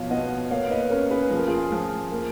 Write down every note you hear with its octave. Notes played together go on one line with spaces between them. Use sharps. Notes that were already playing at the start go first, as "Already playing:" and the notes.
Already playing: B2 F3 C#5 F5
B3 D#5 F#5
A#3 C#5 F5
B4 D#5
C#4 A#4 C#5
G#4 B4
F3 G#4
A#4
F4 G#4
F3
A#3